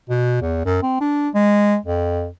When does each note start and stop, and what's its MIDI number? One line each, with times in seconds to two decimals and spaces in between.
0.10 0.41 47
0.42 0.63 40
0.65 0.80 42
0.83 0.97 60
1.01 1.29 62
1.34 1.77 56
1.86 2.28 41